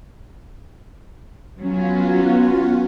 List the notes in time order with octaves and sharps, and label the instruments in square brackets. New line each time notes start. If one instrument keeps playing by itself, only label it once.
[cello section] F#3 C#4 [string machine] B3 F4 F#4